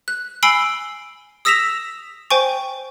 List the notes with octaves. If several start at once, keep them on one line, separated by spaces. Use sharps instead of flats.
F#6
G#5 B5 E6 C7 D7 G7
D#6 E6 A#6 B6 E7 F7
C5 G5 G#5 C#6